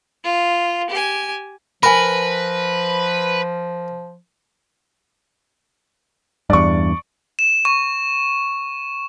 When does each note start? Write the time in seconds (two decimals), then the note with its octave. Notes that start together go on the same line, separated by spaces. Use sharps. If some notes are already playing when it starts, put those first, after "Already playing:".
0.24 F4
0.90 G4 G#5
1.83 F3 A#4 B4 G#5 B5
6.50 E2 G2 D5 C#6
7.39 E7
7.65 C#6